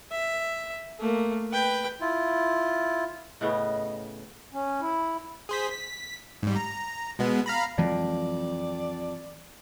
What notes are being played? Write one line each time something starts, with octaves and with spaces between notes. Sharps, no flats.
E5
A3 A#3
B4 G5
E4 F4
A2 C#3 B3 D#5
C#4
E4
G#4 C5 B6
B6
G#2 G3
A#5
B2 G#3 B3
F5 A#5 B5
F2 E3 F#3 G#3 D5